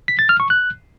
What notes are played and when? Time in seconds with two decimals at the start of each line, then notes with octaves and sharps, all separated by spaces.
0.08 B6
0.19 A6
0.29 F6
0.40 C#6
0.50 F#6